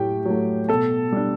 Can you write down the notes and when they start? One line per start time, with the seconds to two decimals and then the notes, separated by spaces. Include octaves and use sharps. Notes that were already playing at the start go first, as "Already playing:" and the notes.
Already playing: A2 F#3 A3 G4 G5
0.26 F#3 A3
0.69 B2 A4 A5
1.12 G3 D4